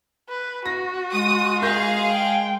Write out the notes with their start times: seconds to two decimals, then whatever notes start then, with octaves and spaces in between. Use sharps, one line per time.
0.29 B4
0.66 F#4 A#6
1.13 G#3 D#6
1.62 G#4 A#4 F5 G6 A#6
2.12 G5